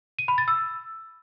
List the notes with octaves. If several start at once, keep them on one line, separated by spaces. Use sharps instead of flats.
D#7
B5
A6
E6